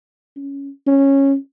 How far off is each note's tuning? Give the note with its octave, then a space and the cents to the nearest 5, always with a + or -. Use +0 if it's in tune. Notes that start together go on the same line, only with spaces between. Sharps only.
C#4 +5
C#4 -10